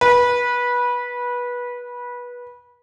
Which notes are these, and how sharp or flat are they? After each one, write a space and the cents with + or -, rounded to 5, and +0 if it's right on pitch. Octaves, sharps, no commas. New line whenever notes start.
B4 -20